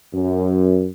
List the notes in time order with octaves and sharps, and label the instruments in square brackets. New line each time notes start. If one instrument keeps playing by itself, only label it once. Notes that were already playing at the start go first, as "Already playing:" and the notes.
[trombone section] F#2